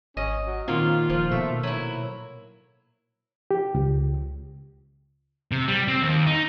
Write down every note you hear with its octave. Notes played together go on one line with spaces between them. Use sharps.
G#1 C#4 D#5
F#3
A#2 D#3 C4 F4
D#1 F3
B2 A3 E5
F#3 E4
G4
C#2
C3
G3
C4
D#2
D#4